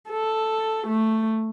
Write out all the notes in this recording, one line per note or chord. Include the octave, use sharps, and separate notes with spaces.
A4
A3